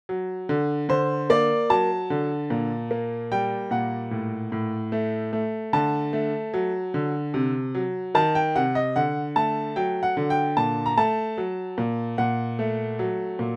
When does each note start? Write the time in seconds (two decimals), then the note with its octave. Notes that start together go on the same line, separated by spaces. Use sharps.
0.09 F#3
0.49 D3
0.89 D3 C5
1.30 A#3 D5
1.70 F#3 A5
2.10 D3
2.50 A#2
2.91 A#3
3.32 G3 G5
3.71 A#2 F#5
4.11 A2
4.52 A2
4.92 A3
5.33 A3
5.73 D3 A5
6.13 A3
6.54 F#3
6.94 D3
7.34 C3
7.75 F#3
8.15 D#3 A5
8.35 G5
8.56 C3 F#5
8.75 D#5
8.96 D3 F#5
9.36 A3 A5
9.76 F#3 G5
10.03 F#5
10.17 D3
10.30 G5
10.57 A#2 A5
10.86 A#5
10.97 A3 A5
11.38 F#3
11.78 A#2
12.18 A#2 F#5
12.59 A3
12.99 F#3
13.39 A#2